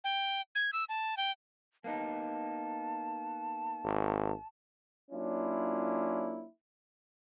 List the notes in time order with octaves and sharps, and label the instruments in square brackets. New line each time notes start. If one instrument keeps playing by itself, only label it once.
[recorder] G5
G#6
E6
A5
G5
[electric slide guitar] A#3 B3 D#4 [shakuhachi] A5
[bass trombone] G#1
[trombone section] F#3 A#3 C#4 D4 E4 F4